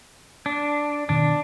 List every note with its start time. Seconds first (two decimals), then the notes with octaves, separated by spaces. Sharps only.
0.46 D4
1.09 B2 D#3 C4 D4